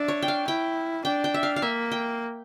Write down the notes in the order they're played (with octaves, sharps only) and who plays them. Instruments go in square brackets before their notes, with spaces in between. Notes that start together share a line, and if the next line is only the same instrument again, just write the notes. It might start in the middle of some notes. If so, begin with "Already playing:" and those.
Already playing: [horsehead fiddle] D4 [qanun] E5
[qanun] C#5
G5
F5
[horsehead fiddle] E4 [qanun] G5
[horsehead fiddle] D4 [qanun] G5
[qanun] G5
E5
F5
F5
[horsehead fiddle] A#3 [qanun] E5
[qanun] G5